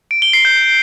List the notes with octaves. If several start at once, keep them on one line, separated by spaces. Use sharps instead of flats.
D7
G7
C7
G6